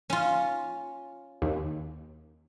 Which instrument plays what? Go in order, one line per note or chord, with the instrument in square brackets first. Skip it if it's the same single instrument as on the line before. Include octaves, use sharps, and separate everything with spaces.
[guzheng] C#4 F4
[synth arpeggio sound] D#2